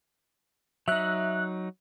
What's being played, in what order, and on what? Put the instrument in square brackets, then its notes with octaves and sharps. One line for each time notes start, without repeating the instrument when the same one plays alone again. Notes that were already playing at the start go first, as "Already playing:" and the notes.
[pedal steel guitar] F#3 D#4 [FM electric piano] E5 F#6